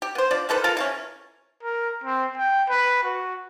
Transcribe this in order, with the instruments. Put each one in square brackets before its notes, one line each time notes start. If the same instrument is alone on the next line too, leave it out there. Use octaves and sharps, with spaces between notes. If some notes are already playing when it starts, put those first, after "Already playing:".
[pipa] G4
B3 C5
F3 D4 D5
D#3 A4 B4 C5
F4 A4 A#4 F5
C3 E3 C#4
[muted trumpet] A#4
C4
G5
B4
F#4